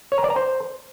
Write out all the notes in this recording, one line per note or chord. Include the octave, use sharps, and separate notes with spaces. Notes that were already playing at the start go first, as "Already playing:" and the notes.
C#5
A#5
D5
A#5
C5